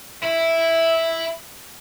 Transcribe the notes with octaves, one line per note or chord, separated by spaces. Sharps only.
E4 E5